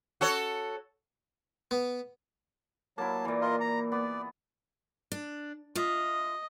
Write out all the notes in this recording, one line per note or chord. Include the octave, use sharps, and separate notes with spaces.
F#4 A4 C#5
B3
F#3 A#3 E4 A5
A#2 E3
F4 A#4 D#5
A#5
B3 D5
D4
F4 D#5 E5